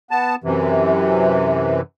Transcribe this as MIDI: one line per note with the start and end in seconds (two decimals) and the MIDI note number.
0.11 0.35 59
0.11 0.35 81
0.44 1.81 42
0.44 1.81 48
0.44 1.81 52